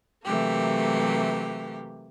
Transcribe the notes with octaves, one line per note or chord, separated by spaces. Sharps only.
C3 E3 F#3 A3 A#3 G4